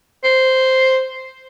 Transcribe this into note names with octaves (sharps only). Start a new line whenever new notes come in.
C5